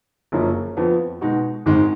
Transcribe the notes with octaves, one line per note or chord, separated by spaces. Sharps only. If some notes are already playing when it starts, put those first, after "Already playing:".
F#1 F#2 F3 A#3 C#4
F2 F3 B3
B2 G#3 D#4 F#4
G#1 G#2 D#3 G#3